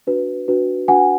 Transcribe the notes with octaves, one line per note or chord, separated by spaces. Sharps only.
D4 F#4 B4
D4 F#4 B4
D4 F#4 B4 F#5 G#5